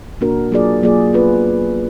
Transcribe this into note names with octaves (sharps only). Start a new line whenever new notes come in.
B2 A#3 D4 F#4 A#4
F#3 A#3 F4 G#4 D5
F#3 A#3 F4 G#4 D5
B3 F4 B4